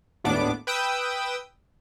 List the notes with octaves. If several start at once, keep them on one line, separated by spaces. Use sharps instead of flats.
G#1 D#2 A2 B3 D4 D6
B4 G5 D#6 E6